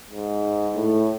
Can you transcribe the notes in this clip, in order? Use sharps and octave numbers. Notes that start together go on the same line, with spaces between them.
G#2
A2